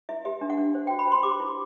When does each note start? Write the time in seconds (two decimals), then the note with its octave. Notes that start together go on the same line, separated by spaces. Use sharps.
0.09 E4 E5
0.25 G4 E5
0.41 D4
0.50 F#5
0.58 D4
0.75 C5
0.87 F#4 G5
0.99 B5
1.07 C5 C6
1.23 G4 D6
1.40 E4